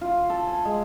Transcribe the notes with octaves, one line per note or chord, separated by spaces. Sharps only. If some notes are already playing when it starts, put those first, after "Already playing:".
F4
A4
G#5
G#3